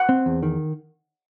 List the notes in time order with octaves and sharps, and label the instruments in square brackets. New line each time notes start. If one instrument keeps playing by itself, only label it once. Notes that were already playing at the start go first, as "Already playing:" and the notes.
Already playing: [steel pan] F#5
[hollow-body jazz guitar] C4
E2
D#3